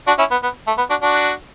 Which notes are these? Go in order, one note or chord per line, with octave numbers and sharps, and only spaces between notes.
D4 F#4
C#4 E4
B3
B3
A3
B3
D4 F#4
D4 F#4